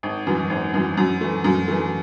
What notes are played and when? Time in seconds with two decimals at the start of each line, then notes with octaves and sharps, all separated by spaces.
0.03 G#1
0.27 F#2 E3
0.50 G#1
0.74 F#2 E3
0.97 F#2
1.21 E3 A3
1.44 F#2
1.68 E3 A3